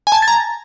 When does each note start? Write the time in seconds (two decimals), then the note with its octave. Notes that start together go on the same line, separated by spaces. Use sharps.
0.07 G#5
0.12 A5
0.17 G#6
0.22 A6
0.28 A#5